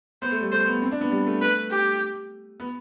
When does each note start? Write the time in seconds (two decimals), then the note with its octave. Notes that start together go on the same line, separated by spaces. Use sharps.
0.22 B3 C5
0.32 A3
0.41 G3
0.52 A3 C5
0.66 B3
0.82 C4
0.92 D4
1.01 B3
1.11 G3
1.26 A3
1.41 B4
1.70 G4
2.60 B3